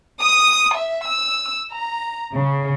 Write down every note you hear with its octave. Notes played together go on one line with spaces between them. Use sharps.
D#6
E5
E6
A#5
C#3